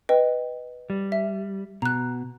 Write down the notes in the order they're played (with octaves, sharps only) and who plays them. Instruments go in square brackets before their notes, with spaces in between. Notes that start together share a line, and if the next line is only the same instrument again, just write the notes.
[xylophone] B4 D#5 G5
[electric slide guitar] G3
[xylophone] E5
[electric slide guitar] B2 [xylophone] A#5 F#6